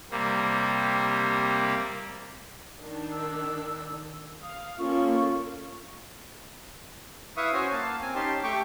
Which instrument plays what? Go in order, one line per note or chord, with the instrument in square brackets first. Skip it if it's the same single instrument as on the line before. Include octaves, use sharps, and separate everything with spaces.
[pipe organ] C3 G3 A#3
[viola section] D#3 D4
[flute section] E6
[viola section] F5 [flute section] D#6
[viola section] A#3 A4 [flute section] C#4 F4 C#6
[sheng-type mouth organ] E4 B4 E5 F5 C#6 D#6
C#4 F#4 C5 C#5 G#5
A#3 F5 A5
C4 G#5
C#4 D#4 G4 A5 C6
A3 G4 G5 C#6 D6